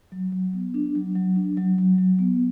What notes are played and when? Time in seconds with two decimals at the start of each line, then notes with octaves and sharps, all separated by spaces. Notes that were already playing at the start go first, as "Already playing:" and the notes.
0.12 F#3
0.32 F#3
0.53 B3
0.74 D4
0.95 F#3
1.15 F#3
1.36 D4
1.57 F#3
1.78 F#3
1.98 F#3
2.19 B3